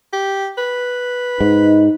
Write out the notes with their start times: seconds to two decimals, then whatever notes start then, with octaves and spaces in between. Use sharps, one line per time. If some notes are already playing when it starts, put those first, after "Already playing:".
0.13 G4
0.58 B4
1.41 G#2 D#4